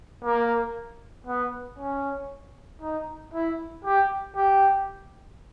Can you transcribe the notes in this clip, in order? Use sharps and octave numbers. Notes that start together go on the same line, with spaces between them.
A#3
B3
C#4
D#4
E4
G4
G4